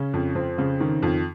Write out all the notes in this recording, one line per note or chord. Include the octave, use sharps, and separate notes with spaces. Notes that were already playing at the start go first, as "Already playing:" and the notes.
Already playing: C#3 C#4
F2
F2 C4
C#3
D#3
F2